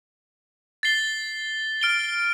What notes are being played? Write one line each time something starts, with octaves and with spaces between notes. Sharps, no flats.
A6 C7 G7
F6 D7 G7